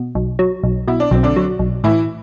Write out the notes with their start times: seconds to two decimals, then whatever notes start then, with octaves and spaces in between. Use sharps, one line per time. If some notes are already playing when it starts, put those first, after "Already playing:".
Already playing: B2
0.15 B1
0.39 F#3
0.63 B1
0.88 B2 E4
1.00 D4
1.11 B1 C4
1.23 D3 D4
1.36 F#3
1.59 B1
1.84 A2 E3 E4